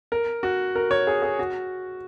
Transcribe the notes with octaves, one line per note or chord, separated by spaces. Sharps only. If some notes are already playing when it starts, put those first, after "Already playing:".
A#4
F#4
A#4
C#5
G#4
G#4
F#4